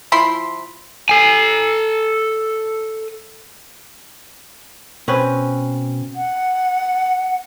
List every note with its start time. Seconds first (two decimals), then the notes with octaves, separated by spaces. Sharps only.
0.12 F3 E4 B5 C6
1.09 A4 G#5
5.08 B2 C4 C#4 B4
6.16 F#5